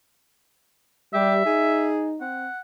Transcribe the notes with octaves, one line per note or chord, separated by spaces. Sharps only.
G3 G4 E5
D#4 G#4
C4 F#5